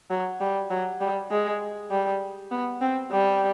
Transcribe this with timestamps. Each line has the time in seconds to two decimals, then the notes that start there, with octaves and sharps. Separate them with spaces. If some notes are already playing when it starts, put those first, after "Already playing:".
0.10 F#3
0.41 G3
0.70 F#3
1.00 G3
1.31 G#3
1.91 G3
2.51 B3
2.81 C4
3.11 G3